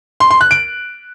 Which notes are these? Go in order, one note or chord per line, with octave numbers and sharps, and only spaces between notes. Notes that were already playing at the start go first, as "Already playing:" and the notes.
C6
C6
F#6
D7